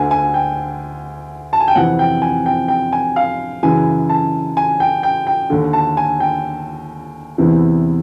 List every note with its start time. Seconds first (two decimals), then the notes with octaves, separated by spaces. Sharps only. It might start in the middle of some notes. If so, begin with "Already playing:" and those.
Already playing: D2 D3 G#5
0.11 G#5
0.34 G5
1.53 A5
1.60 G#5
1.68 G5
1.75 F2 C3 E3 F#5
1.99 G5
2.22 G#5
2.46 G5
2.68 G5
2.93 G#5
3.16 F5
3.63 F#2 C#3 E3 G#5
4.09 A5
4.57 G#5
4.80 G5
5.03 G5
5.27 G5
5.50 D#2 D3
5.73 A5
5.97 G#5
6.20 G5
7.38 E2 C3 E3